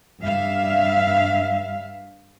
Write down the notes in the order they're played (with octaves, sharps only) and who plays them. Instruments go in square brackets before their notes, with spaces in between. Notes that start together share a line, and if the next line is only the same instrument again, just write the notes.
[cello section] G2 G3 E5 F5